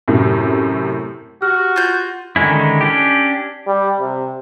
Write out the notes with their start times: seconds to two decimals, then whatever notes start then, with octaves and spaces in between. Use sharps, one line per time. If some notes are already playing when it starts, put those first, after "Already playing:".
0.08 F#2 A2 C3
1.42 F#4 G4 F6
1.76 F4 G6
2.36 D3 D#3 G#3 C#4 E4
2.81 C#4 D4 G4
3.67 G3
4.00 C3